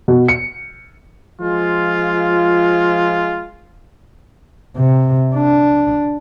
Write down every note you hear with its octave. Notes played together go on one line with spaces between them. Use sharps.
B2
C#7
F3 G#3 F4
C3
D4